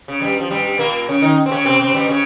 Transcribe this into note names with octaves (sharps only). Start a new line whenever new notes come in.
C#3
G2 G3
F3
G2 G3
A#2 A#3
C#3 C#4
D#3 D#4
C4
C#3 C#4
C3 C4
C3 C4
G2 G3
C#3 C#4